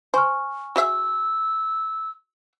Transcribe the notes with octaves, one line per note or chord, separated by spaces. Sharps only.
C5 G#5 C#6 F6
F#4 G#4 E5 E6